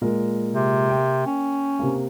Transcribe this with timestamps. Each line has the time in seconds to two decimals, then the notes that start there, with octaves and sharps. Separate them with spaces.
0.01 A#2 G#3 A#4
0.54 C3
0.90 A#3 G5
1.26 C#4
1.79 C3 A#3